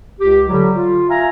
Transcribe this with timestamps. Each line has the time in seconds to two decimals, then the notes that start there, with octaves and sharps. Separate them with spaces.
0.20 C#2 G4
0.48 D3 F#3 G3
0.74 F4
1.09 E5 F5 G#5 A#5